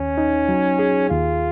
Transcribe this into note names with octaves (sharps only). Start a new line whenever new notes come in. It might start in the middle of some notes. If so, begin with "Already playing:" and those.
Already playing: D#2 C#4
D#4
F#3
G#4
D#2 F4